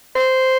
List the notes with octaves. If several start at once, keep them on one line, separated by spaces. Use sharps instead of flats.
C5